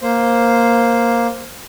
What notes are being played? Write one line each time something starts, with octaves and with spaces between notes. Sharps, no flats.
A#3 C5